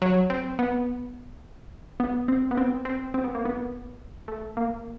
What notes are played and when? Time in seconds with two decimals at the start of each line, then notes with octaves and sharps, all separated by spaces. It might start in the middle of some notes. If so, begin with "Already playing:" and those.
0.02 F#3
0.30 C4
0.59 B3
2.00 B3
2.28 C4
2.51 B3
2.57 C4
2.85 C4
3.14 C4
3.24 B3
3.35 A#3
3.45 B3
4.28 A3
4.57 A#3